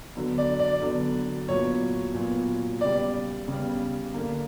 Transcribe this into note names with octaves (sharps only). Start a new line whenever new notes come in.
D3 F#3 B3
D5
D5
D3 F#3 B3
A#2 F#3 B3 C#5
A#2 F#3 B3
C#3 G3 B3 D5
C#3 G3 B3
D3 A#3